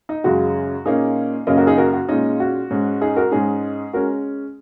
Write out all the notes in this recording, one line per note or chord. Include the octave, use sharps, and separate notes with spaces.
D#4
F#2 C#3 G#3 F#4
A#2 A#3 C#4 D#4 G#4
F#2 C#3 A#3 C#4 A#4 D#5
F#4 A#4
D#4 G#4
F#4 A#4
F#4
A#2 G#3 C#4 D#4
F#4
G#2 G#3 C#4
D#4 G#4
F#4 A#4
G#2 G#3 C#4 D#4 G#4
G#3 C#4 F#4 A#4